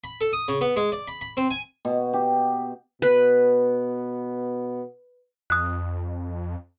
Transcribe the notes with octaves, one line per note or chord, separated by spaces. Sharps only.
B5
A4
D#6
C#3
B3
G#3
D5
B5
B5
C4
G#5
B2
G4
B2 B3 B4
F2 D#6 F#6